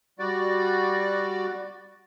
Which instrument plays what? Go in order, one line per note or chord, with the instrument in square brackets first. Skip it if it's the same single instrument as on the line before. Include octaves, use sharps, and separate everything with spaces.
[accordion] G3 F#4 D5